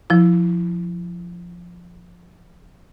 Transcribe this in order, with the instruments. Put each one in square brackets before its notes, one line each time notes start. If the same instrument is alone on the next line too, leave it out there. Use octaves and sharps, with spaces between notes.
[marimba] F3 E4